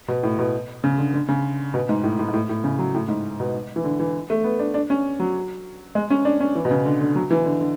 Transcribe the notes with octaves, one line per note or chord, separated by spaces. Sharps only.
B2
A2
B2
C#3
D3
D3
C#3
B2
G#2
A2
A2
G#2
A2
A2
C#3
F#3
A2
G#2
B2
E3
D3
E3
A3
B3
D4
D4
C#4
F#3
G#3
C#4
D4
C#4
E3
B2
C#3
D3
D3
F#3
E3
D3
D3